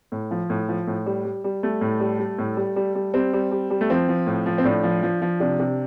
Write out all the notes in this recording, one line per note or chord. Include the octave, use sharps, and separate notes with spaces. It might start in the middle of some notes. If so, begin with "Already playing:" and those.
A2
F3
A2
F3
A2
G3
G3
G3
G3 A3
A2
G3
G3
A2
G3
G3
G3
G3 C4
G3
G3
G3
A3
F3 C4
F3
A2
F3
C4
A2 D4
F3
F3
F3
C3 D4
C3